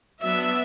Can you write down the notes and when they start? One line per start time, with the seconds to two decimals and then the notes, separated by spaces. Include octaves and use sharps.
0.21 F#3 B3 D4 E5